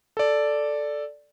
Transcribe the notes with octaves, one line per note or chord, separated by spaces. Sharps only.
A4 D5